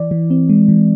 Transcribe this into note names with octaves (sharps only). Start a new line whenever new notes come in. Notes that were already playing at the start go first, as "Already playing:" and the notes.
Already playing: E3 D5
E3
C4
G#3
E3